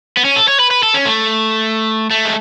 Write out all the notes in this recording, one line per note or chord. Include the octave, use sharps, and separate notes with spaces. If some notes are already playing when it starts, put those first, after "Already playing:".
B3
C#4
A4
C#5
B4
B4
A4
C#4
A3
A3
G#3